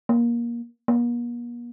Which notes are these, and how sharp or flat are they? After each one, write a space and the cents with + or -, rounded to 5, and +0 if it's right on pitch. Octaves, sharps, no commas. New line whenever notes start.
A#3 +20
A#3 +45